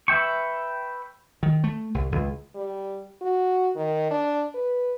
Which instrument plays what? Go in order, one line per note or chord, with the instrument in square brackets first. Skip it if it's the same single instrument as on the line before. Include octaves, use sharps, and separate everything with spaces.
[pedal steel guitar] B4 E5 G5 C#6
[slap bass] D#3
A3
C2
C#2
[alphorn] G3
F#4
D#3
D4
B4